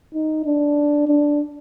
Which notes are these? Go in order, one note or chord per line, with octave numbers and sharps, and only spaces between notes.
D#4
D4
D4